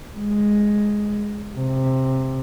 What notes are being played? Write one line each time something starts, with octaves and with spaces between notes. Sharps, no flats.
G#3
C3